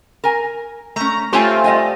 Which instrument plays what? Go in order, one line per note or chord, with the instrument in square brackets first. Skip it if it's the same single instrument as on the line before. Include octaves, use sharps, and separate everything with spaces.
[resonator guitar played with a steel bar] A#4 G#5
[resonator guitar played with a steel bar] A3 C#4 [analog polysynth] A#5
[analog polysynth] A3 C4 F4 [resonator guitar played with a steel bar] G4 C#5 G#5
[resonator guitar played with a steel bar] G3 D#5 G#5